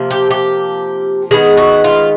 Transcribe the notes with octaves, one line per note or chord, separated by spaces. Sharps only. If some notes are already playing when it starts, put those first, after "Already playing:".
Already playing: C3 F3 A#3
G4
G4
D#3 G#3 B3 G#4
F#4
F4